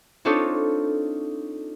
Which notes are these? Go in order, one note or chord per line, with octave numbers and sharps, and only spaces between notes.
C4 D4 D#4 F4 A4 C#5